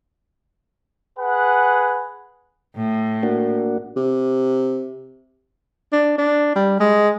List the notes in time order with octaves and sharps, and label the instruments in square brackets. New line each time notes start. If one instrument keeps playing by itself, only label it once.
[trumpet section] G#4 B4 F#5
[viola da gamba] A2
[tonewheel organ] A#3 D4 F#4
[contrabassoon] C3
[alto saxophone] D4
D4
G3
G#3